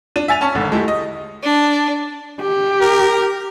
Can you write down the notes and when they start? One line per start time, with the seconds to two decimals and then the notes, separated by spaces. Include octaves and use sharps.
0.16 D4 D#7
0.28 E5 G#5 A6 F7
0.41 C#4 A5 C#6
0.55 G#1 D3
0.72 G#3 A3 E4 G4
0.88 D#5
1.43 D4
2.42 G4
2.81 A#4